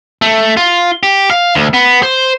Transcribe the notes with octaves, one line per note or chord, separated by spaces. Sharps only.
A3
F4
G4
F5
D2
B3
C5